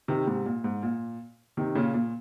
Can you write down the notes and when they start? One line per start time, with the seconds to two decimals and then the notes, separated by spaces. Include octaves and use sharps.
0.08 C3 D#3
0.27 G#2 C3
0.46 A#2
0.64 G#2
0.83 A#2
1.57 C3 D#3
1.75 A#2 C#3
1.94 A#2